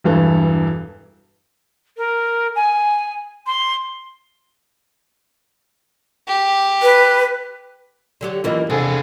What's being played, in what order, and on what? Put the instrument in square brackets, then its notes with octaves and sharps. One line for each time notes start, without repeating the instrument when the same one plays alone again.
[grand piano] E1 G2 E3 A4
[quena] A#4
G#5
C6
[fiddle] G4
[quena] B4
[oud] D3 F#3 G4
[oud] F#2 E3 A#3 [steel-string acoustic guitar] F4 A#4 D#5
[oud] E2 [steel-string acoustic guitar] C3 [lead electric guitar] D4 G#4 [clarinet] A4